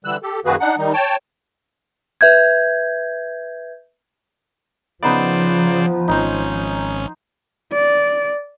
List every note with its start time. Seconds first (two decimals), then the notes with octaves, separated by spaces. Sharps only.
0.05 D3 E3 G3 E6 F#6
0.23 G4 A4
0.45 F#2 D#3 A#3 F#4 G#4 B4
0.60 D4 D#4 F#5
0.78 D#3 G3 D#4
0.93 C#5 G5 A5
2.21 B4 E5 G6 G#6
5.03 C#3 F3 B3 D#4 B4 C5 D5
6.08 G#1 C#4 D#4 C5
7.73 D5